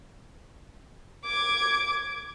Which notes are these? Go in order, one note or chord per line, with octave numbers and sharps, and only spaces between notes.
D6 G#6